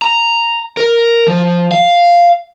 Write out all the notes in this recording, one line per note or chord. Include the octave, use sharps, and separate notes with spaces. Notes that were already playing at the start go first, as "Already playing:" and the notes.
A#5
A#4
F3
F5